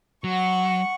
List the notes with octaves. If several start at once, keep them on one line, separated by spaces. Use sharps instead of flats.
F#3 F#5 C#6